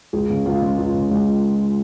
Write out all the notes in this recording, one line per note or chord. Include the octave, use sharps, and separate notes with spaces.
C#2 G#4
C#3
C#2 F4
C#3 G#3
C#2
C#3
C#2